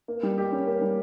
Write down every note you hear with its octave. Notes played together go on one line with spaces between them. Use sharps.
A#3
G3
G4
C#4
A#3
G3